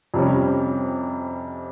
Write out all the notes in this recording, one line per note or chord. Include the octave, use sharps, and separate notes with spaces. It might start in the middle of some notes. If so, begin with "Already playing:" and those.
F2 C3 G3 C#4